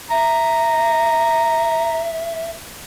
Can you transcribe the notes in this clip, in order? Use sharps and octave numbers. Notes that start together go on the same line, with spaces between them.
E5 A#5